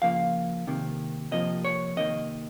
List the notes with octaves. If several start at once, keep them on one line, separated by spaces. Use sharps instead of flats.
C#3 F3 A#3 F5
C3 D#3 A#3
C3 F3 A#3 D#5
C#5
C3 D#3 A#3 D#5